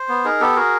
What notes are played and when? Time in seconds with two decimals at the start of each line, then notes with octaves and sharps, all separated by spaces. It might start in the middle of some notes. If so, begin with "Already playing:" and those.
Already playing: C5
0.09 B3
0.25 D#4 G#4 A#4
0.41 B3 G4 A4
0.56 F#4 G#4 A#4